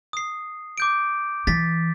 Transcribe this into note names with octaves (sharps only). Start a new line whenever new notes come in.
D#6 C7
D6 G6 D7
E3 A6 B6